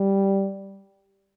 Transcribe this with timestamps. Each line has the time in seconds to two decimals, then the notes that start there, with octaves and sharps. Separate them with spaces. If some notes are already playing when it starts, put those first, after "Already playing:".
Already playing: G3